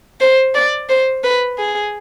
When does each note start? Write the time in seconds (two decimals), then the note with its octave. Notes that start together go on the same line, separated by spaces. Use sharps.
0.21 C5
0.55 D5
0.89 C5
1.24 B4
1.58 G#4